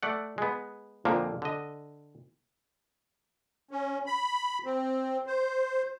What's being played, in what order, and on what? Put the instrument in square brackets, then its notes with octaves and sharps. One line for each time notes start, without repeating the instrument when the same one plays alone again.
[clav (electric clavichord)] A3 D5 F#5
G#3 B3
F2 A#2 D3 F3 A#3
D3 D#5
[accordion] C#4
B5
C4
C5